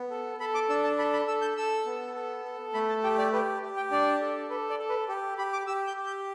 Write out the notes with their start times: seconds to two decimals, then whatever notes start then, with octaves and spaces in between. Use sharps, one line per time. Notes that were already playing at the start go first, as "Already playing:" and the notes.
Already playing: B3
0.11 A4
0.40 A4 B5
0.54 D6
0.69 D4 E6
0.84 A5
0.98 A4 B5
1.13 B5
1.28 A4 E6
1.42 G6
1.57 A4 E6
1.86 B3
2.15 A4
2.45 A4
2.74 A3 B5
2.89 A5
3.04 G4 G5
3.18 D5
3.33 G4 B4
3.62 G4
3.77 G5
3.91 D4 D5
4.21 A4
4.50 A4 B4
4.70 D5
4.79 A4
4.89 B4
5.08 G4 A4
5.38 G4 B5
5.53 D6
5.67 G4 E6
5.87 G6
5.97 G4
6.06 G6